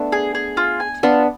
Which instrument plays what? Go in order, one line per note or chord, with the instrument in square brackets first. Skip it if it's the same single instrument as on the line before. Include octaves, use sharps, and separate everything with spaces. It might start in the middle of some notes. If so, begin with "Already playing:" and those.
Already playing: [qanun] A3 B3 D4
[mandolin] G#4
G#4
F4
G#5
[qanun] B3 D4 [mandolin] F4